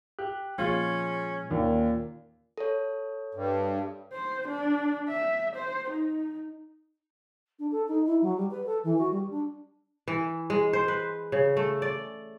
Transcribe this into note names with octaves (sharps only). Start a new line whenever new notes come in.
G4 F#6
A#2 F3 G#3 C#4 F4
D#2 A#2 D#3 C#4
A4 C#5
G2
C5
D4
E5
C5
D#4
D4
A4
D#4
E4
F#3
G3
B4
A4
E3
F#4
G3
D4
E3
G#3
C5
B4
C#3
A3
D5